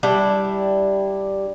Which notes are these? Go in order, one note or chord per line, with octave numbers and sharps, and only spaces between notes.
G3 D4 E4 G5